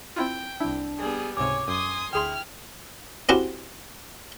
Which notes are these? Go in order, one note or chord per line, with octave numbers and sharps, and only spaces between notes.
C4 E4 F4 G5
C2 D4 E4
G3 B3 G#4
C#2 G#2 C3 C#5 G#5 D6
F#2 G#5 C6 D#6
D2 E4 G#4 G5 C6 F6
C4 C#4 E4 F#4 G4